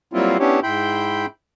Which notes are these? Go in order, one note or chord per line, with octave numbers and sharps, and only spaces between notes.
F#3 G3 A#3 C4 E4 F4
B3 C#4 D4 E4 G4 C#5
G#2 E4 G5 B5 C6 G6